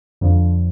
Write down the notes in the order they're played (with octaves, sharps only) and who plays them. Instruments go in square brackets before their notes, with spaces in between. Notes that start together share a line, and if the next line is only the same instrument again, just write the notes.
[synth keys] F2 D3 F3